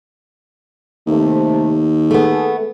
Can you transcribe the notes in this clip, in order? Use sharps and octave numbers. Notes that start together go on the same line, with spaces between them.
D#2 C3 A3
A3 B3 G#4 A4